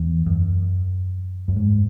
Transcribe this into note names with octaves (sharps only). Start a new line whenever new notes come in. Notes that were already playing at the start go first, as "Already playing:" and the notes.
Already playing: E2
F#2
F#2
G#2